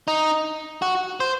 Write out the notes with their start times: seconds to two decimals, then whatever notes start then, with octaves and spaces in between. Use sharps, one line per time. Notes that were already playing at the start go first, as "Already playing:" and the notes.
0.08 D#4
0.82 F#4
1.20 C5